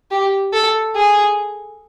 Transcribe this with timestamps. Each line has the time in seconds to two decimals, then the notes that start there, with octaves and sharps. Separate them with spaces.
0.11 G4
0.53 A4
0.95 G#4